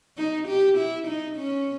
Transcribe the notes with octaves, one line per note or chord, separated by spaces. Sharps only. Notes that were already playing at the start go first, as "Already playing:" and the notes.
D#4
G4
E4
D#4
C#4